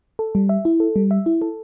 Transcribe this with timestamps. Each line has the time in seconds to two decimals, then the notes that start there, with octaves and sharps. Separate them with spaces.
0.19 A4
0.35 G3
0.49 E5
0.65 E4
0.80 A4
0.96 G3
1.11 E5
1.26 E4
1.42 A4